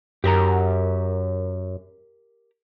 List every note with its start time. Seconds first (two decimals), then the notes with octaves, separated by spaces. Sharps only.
0.24 F#2 G4 A#4 A#5